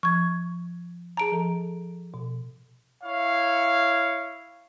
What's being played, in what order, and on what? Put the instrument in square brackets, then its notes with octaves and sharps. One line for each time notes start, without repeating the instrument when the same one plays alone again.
[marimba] F3 [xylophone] C#6 G#6
[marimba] G#4 A5 [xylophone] A#5 D7
[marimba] F3 A4
B2
[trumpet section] E4 C#5 F5